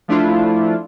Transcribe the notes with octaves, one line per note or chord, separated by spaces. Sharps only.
F3 A3 D4 E4 F4